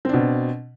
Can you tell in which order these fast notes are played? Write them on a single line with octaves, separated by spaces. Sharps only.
C4 D4 B2